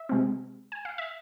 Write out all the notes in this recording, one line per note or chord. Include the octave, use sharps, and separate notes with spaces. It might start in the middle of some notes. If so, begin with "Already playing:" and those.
Already playing: E5
C3 G#3 C4
G#5
F5
E5